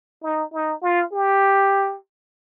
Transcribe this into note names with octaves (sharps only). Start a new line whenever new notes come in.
D#4
D#4
F4
G4